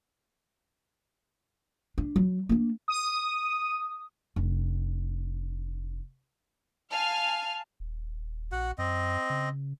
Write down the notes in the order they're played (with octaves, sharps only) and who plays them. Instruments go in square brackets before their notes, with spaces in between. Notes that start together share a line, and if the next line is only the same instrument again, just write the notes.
[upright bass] D4
F#3
A#3 D4
[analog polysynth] D#6
[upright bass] F1 D4
[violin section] F5 G#5 F6 [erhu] A5
[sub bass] D#1
[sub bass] A#1 [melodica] F#4 F#5
[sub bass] F#2 [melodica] C4 D#5
[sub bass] C#3